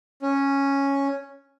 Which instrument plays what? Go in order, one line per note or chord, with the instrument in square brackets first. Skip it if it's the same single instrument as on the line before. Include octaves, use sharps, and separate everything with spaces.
[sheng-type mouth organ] C#4